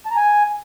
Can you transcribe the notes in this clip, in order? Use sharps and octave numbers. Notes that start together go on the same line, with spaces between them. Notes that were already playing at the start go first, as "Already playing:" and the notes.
A5
A#5
G#5